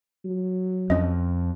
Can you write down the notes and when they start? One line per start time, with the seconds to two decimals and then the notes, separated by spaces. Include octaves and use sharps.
0.25 F#3
0.90 F2 C#4 D#5